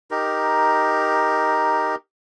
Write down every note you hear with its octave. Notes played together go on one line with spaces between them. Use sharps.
D#4 G4 A#4